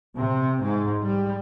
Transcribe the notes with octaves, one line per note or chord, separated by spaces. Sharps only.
C3
G#2
G3